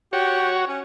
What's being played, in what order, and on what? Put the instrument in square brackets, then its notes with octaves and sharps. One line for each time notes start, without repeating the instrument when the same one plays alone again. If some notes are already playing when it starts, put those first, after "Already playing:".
[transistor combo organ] F#4 C#5 [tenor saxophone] G4
[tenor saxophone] C#4